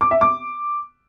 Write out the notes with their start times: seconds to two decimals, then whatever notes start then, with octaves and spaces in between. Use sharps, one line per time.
0.01 D6
0.11 E5
0.21 D6